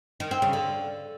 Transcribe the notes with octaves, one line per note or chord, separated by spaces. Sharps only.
D#3
C4
C#3
D3